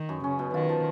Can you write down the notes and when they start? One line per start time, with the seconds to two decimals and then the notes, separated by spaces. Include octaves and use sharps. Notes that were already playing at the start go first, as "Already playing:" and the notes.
Already playing: D#3 D#4
0.09 F#2
0.24 C#3 C#4
0.39 B2
0.54 D#3 F4
0.69 F3